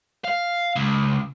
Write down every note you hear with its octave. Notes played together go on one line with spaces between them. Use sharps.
F5
C#2